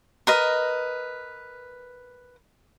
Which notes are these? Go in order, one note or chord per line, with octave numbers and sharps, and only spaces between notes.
A#4 B4 D#5